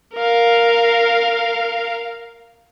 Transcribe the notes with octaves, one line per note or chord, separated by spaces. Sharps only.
A#4 F5